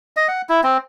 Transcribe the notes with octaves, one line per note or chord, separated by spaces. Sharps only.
D#5
F#5
E4
C4